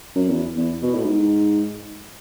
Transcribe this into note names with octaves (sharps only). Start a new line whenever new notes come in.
F#2
E2
E2
B2
A2
G#2